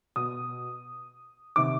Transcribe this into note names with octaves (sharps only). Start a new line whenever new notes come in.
B2 D#6
C3 D#3 D6